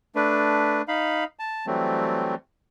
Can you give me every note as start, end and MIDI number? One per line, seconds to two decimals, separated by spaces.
0.15 0.82 57
0.15 0.82 62
0.15 0.82 71
0.88 1.24 63
0.88 1.24 77
0.88 1.24 83
1.39 1.66 81
1.67 2.35 52
1.67 2.35 54
1.67 2.35 55
1.67 2.35 57
1.67 2.35 60